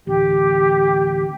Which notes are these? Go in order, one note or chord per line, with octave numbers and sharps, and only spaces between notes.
A1 D2 G4